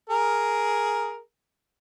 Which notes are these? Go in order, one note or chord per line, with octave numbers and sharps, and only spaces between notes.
G#4 A#4